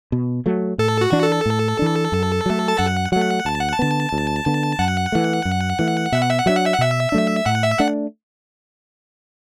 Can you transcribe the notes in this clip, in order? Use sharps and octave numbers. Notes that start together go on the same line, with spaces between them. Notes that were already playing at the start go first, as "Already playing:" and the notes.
B2
F#3 A3
A2 A4
F#4
E3 D4
A4
A2
E3 D4
F#2
F#3 A3
A5
F#2 F#5
F#3 A3 F#5
D2 A5
F#5
A5
D3 B3
D2
D3 B3
F#2 F#5
E3 A3
F#2
E3 A3
B2 E5
F#5
E5
F#5
F#3 A3 D4 E5
F#5
E5
F#5
B2 E5
F#3 A3 D4
A2 F#5
E5
A3 D4 F#5